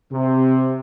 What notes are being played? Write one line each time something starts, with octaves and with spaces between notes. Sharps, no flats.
C3